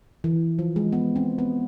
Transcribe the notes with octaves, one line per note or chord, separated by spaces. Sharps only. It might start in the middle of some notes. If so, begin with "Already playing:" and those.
E3
F3
G#3
B3
C4
B3